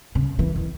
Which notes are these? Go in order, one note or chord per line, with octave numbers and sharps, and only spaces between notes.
C#3
E3
D#3